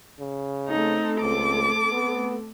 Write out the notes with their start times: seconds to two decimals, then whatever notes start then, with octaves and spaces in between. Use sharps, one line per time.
0.20 C#3
0.68 A3 C4 D#4 A4
1.21 C#2 D6
1.92 B3